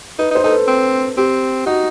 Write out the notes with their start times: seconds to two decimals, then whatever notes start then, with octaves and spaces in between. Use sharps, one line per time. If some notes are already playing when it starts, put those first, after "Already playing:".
0.19 D#4 B4
0.31 D#4
0.35 C5
0.43 D#4 A4
0.51 B4
0.68 C4
1.17 C4 G4
1.66 D#4 F#4